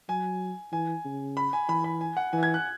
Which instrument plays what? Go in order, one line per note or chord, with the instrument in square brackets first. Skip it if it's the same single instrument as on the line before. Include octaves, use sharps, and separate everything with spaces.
[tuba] F#3 [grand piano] G#5
[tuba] E3 [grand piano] G#5
[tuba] C#3
[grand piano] B5
G#5
[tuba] E3 [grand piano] B5
[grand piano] B5
G#5
F#5
[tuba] E3 [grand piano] G#5
[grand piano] G#6
F#6